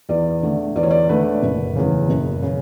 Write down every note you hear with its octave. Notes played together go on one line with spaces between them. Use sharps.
E2 D5
D3 A3
E2 D5
C#5
D5
D3 A3 B4
F#1
E2 C#3
F#1
C#3